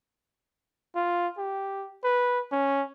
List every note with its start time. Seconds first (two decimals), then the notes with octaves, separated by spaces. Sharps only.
0.95 F4
1.38 G4
2.04 B4
2.52 C#4